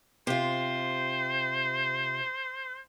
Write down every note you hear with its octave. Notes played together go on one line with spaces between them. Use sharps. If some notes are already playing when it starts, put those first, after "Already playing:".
C3 F4 C5